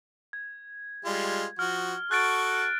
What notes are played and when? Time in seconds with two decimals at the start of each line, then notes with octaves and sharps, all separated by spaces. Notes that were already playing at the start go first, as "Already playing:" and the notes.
0.33 G#6
1.05 G3 G#3 F4
1.59 F3 F#4 F6
2.11 F#4 A4 C#6 F#6 A6 D7